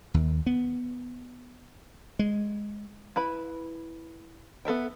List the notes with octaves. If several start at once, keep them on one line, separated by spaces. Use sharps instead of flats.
D#2
B3
G#3
E4 B4 B5
B3 A4 E5 G5